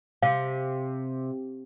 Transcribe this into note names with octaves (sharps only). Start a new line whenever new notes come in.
C3 F5